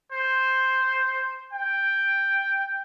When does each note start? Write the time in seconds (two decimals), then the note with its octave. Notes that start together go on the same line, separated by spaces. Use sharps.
0.12 C5
1.53 G5